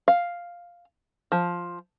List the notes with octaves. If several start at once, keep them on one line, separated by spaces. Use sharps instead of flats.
F5
F3